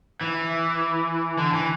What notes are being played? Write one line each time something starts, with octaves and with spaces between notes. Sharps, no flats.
E3
D3
E3